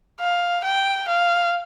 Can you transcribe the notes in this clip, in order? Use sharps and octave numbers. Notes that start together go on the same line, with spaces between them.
F5
G5
F5